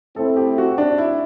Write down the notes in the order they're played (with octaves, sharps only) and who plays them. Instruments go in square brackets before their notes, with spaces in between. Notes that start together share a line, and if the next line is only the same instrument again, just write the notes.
[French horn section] A3 C4 E4 [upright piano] A4
[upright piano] G4
F#4
D4
E4